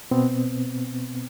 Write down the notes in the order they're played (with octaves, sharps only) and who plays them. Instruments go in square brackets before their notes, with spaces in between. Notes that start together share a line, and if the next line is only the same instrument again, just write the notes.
[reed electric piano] B2 B3 C4